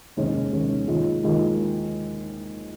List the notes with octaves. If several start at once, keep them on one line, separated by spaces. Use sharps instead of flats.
F1 D#2 D#3 G#3 C#4
F1 D#2 D#3 G#3 C#4
D#2 D#3 G#3 F4
D#2 D#3 G#3 F4